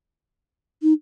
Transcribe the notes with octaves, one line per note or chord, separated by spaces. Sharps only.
D#4